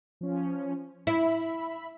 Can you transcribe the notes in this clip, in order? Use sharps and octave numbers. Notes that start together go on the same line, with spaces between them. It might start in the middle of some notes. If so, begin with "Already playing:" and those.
F3 C#4
E4 E5 B5